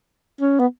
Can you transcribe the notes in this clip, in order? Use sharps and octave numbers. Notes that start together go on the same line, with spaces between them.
C#4
B3